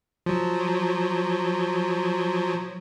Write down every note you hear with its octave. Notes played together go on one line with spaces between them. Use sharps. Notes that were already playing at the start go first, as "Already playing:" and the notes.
F3 F#3